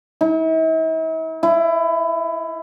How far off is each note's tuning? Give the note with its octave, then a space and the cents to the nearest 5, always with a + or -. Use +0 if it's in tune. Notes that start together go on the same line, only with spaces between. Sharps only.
E4 -45
E4 +20